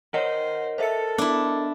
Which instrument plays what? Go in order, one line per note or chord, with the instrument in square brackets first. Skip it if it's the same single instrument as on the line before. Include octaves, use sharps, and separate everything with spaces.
[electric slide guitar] A#4 D#5 [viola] C5 [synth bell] C#5 F#5
[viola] A4 [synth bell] C5 E5 C#7
[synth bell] B3 [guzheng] D4 E4